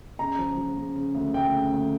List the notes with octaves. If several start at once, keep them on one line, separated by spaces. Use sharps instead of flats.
C#3 A#5
F3
F3
C#3
C#3
D2
D2 G5
C#3
D2